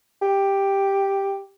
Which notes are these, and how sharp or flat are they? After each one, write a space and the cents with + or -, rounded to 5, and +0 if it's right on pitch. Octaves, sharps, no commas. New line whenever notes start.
G4 +5